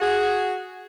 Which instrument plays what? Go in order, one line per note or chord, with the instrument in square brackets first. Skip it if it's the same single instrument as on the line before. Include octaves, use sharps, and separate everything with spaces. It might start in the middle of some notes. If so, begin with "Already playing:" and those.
[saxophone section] F#4 G#4